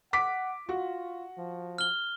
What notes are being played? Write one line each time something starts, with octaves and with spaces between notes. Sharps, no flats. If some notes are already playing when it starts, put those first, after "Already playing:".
F#5 D6 B6
F4 F#4
F3
F6 G7